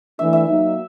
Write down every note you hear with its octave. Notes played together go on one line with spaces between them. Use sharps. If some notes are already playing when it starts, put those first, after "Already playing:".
E3 A3 D4 E5
E5
F#3 A#3 D#4